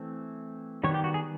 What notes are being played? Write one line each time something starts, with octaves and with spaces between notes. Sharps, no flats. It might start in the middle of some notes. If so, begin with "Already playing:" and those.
Already playing: E3 A3 C4
D#3 G3 B3 C#5
G4
F#4
G#4